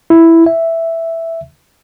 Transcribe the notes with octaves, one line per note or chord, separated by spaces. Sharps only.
E4
E5